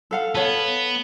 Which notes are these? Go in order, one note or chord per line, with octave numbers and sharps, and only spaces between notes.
A4 F5 F#5
B3 A4 C#5 F5